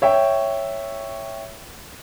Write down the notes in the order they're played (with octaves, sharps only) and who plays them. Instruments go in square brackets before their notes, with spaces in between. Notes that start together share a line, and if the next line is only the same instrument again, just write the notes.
[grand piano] C#5 E5 G5